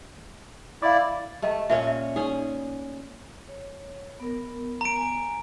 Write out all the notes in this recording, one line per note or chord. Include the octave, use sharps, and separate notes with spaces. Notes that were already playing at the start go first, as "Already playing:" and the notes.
E4 D5 F5 D6
A3 G4 D#5 A5
A#2 C#4 C#5 E5
E5
C#4 D#4 G#4
C#5
B3 A#4
A#5 D7
G#5